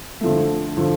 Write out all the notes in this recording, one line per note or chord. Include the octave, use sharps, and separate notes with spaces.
D3 F3 A3
D3 F3